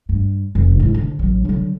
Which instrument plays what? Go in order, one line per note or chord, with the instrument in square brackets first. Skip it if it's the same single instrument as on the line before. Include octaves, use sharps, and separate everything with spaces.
[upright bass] G2
F1
G#2 E4
D3
A1 F#3
D3 F#3